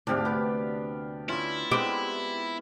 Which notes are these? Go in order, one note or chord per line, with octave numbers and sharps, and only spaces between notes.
D2 G#2 C3 D4 G4 D5 F5
B3 G4 D5
C#4 E4 F4 D5
G#3 B3 C4 G4